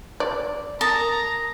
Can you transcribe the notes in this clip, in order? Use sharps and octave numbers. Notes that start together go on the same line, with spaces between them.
D5
A#4 A5 A#5 D#6